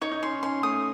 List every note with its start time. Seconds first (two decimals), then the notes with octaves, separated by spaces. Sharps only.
0.02 D#4 C#5
0.12 D#4
0.23 C#4 C6
0.43 C#4 C6
0.63 A3 D#6